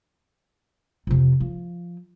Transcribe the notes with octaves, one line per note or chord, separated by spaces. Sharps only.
F2 C3
F3